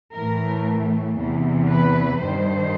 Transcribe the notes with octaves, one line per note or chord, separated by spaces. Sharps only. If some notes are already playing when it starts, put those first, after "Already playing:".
A2 E3 A3 A#4
E2 C3 E3
B4
G2 D#3 G3 C5